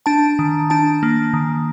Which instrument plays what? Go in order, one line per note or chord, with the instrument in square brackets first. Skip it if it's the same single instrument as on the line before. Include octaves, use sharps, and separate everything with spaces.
[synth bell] D4 A5
D#3
D4 A5
A#3
D#3